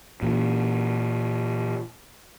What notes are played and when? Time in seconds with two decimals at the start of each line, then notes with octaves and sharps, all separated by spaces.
0.23 A#2 E3